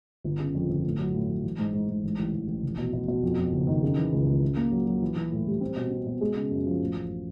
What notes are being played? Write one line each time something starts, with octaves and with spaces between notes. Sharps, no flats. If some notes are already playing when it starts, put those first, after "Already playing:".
G1
C#3
F2
G1
A2
F#3
A2
F#3
E3
G#2
G#2
G#2
A1
A1
A1
A1
F1
B2
B2
B2
F2
F2
F#1
D#3
C#3
E3
C#2
C#2
C#3
A#3
F#3
F#3
E3
E3
A2
G3
C4
B2
C4
B2
G#3
C#3
F#2
F3
A2
A1